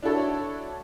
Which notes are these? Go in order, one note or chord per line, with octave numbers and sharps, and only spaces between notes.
D4 E4 F#4 A4 C#5